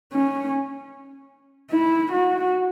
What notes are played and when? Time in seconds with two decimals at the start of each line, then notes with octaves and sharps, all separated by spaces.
0.13 C#4
1.71 E4
2.11 F#4